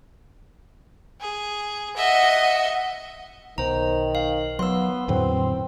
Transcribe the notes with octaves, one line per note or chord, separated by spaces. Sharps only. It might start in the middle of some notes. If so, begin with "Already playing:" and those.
G#4
D#5 E5 F#5
B1 D#3 C5 A#5
F5
F#3 B3 C6 E6
E2 A2 D3 F#3 C4